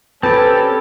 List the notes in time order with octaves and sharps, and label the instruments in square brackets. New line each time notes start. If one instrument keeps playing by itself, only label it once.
[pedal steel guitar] C4 C#4 G4 [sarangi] A4 [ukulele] B4 [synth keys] A5